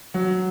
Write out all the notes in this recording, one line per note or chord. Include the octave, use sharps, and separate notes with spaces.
F#3